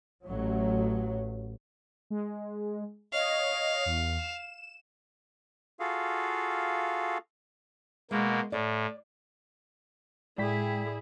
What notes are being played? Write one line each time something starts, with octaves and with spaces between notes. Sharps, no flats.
A1 F#3
G#3
C#5 D#5 F5
E2
E7
F4 F#4 G#4 A4 F5
B2 G#3 A#3
A2 D5
A2 G#3 E4 G#4 D5 G5 B6